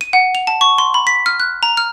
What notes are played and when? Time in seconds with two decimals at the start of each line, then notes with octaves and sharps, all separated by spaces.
0.01 D#7
0.13 F#5
0.35 F7
0.47 A5
0.61 C#6
0.78 C6
0.94 B5
1.07 B6
1.26 F6
1.40 F#6
1.63 A#5
1.77 F6